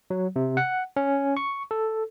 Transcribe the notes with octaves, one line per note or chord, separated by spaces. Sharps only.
F#3
C3
F#5
C#4
C#6
A4